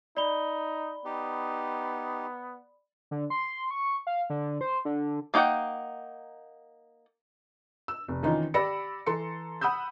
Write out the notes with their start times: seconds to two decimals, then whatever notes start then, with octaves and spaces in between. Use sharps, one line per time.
0.17 D#4 D5 B5 G7
1.05 B3 D#4 G4
3.11 D3
3.30 C6
3.71 C#6
4.07 F5
4.30 D3
4.61 C5
4.85 D3
5.34 A#3 D#4 C#5 F#5 G5
7.88 E6
8.08 F1
8.23 D#3 E3 C#4 D#4 F4
8.54 G4 D5 B5 E6 A#6 C#7
9.06 E3 A4 A#5 C6 C#7
9.61 F#5 B5 D#6 E6 G6